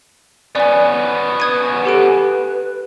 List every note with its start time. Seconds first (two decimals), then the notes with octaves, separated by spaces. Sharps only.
0.55 B3 C#4 D5 G#5
1.40 B4 D#6 G#6 D#7
1.85 G4 A4 B4 D7